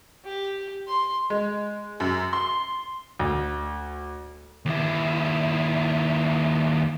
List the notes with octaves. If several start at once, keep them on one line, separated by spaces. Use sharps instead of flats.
G4
C6
G#3
F#2
C6
D2
D#2 E4